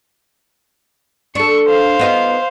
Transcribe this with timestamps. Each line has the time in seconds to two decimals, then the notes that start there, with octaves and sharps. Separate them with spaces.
1.35 D4 A4 C#6
1.67 C5 F5
1.99 B3 D#4 F4